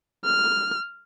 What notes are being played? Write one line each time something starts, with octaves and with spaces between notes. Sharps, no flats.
F6